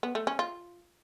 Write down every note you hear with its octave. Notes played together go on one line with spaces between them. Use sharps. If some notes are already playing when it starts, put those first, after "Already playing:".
B3
A3
C#4
F4